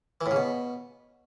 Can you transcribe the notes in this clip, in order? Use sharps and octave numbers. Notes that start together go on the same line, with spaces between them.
E3
A2
C#3
B2